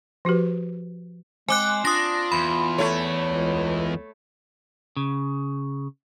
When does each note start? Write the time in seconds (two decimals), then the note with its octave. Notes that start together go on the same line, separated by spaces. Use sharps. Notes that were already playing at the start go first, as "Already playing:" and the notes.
0.25 F3 F#4 G4 B4
1.49 G#3 C4 G#5 D6 F#6
1.85 D4 F4 D#6 A#6
2.32 E2 B5
2.78 A3 C#5
3.28 C#2
4.97 C#3